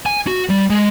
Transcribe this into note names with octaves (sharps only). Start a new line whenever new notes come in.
G#5
F#4
G3
G#3